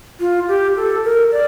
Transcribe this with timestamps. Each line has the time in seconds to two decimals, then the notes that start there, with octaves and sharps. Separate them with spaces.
0.20 F4
0.48 G4
0.76 A4
1.04 A#4
1.32 D5